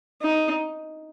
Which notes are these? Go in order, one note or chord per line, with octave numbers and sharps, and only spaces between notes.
D#4